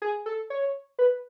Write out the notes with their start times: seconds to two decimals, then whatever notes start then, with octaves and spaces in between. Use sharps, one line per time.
0.02 G#4
0.26 A4
0.50 C#5
0.99 B4